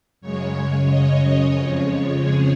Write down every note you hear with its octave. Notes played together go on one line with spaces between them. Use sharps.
F#2 C#3 G#3 C#5
D#5
F2 C#3 F3 G#3 C#5
G#4